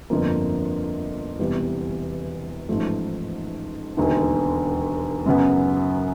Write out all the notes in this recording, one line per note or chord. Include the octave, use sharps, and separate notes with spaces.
G1 F2 D3 F3 A#3
E1 E2 C3 E3 G3
A1 G#2 F3 A3
E1 D#2 D3
F#2 C#3 F#3 B3